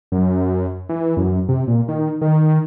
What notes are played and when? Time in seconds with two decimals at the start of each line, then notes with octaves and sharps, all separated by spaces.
0.12 F#2
0.89 E3
1.17 F#2
1.49 C3
1.67 A#2
1.88 D#3
2.21 D#3